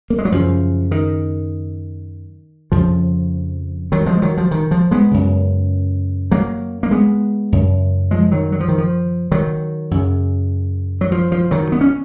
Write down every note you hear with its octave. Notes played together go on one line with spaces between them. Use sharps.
A#3
G#3
F#3
F#2 C#3 F3
D#3
F2 C#3 F3
D#3 F#3
F3 G#3
D#3 F#3
F3
D#3
F3
G#3 B3
F#2 C#3
F#3 A#3
A#3
G#3 B3
F#2 C#3
F3 G#3
D#3 F#3
F#3
F3
D#3
F3
D#3 F#3
F#2 C#3
F#3
F3
F3
D#3 F#3
B3
C#4